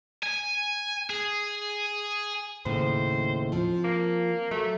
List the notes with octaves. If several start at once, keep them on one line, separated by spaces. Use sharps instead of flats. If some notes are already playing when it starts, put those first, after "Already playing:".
G#5
G#4
D#2 A2 C#3 C5
F3 C4
A#3
F#3 A3